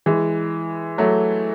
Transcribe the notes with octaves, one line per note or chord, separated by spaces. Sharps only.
E3 G#3
F#3 A3